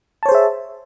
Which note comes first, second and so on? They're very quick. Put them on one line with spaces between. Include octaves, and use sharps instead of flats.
A5 C#5 C5 G#4 E5